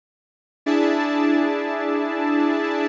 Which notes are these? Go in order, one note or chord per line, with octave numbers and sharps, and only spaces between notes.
D4 E4 G#4 D5 E5 A5